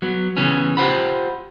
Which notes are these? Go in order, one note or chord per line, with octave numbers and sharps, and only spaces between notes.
F#3 B3
C#3 E3 B3 C#4
F4 G4 C5 F#5 B5